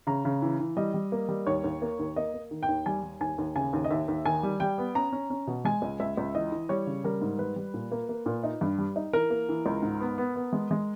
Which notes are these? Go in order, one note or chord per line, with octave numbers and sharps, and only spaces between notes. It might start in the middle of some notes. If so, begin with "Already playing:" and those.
C#3 A#5
C#3
E3
E3
G3 D#5
G3
A#3
G3
D#2 C#5
D#2
A#3
D#2
A#3 D#5
A#3
D#3
G5
D#2
G3 G#5
G3
D#2 G#5
D#2
C#3 G#5
D#2
D#5
D#2 E5
D#2
D#3 G#5
G3
G3 G5
B3
C#4 A#5
C#4
C#4
B2
G#3 G#5
C#2
C#2 E5
C#2
E3 D#5
E3
G3 C#5
C#3
G3 A#4
G#2
G3 B4
G3
A#2
A#3
A#3
A#2
D#4
G2
G3
D#4
E3 A#4
A#3
E3
C#2
G#2
B3
B3
B3
G#3
G#3